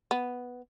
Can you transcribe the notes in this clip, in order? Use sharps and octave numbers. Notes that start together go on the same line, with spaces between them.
B3